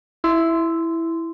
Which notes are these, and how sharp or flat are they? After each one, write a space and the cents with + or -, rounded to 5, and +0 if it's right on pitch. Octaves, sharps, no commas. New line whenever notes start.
E4 +0 C6 -20